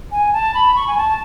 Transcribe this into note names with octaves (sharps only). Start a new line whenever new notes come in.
G#5
A5
B5
C#6
G#5
A5